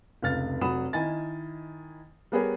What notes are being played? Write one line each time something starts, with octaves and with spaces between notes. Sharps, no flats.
F1 C#2 F6 A6
F1 F#3 F#5 B5 D#6 E7
D#3 E4 D#5 G#5 A6
G3 B3 G#4 A#4 B4 C#5